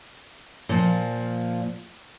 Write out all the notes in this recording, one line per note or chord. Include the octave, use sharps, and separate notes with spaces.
A#2 F3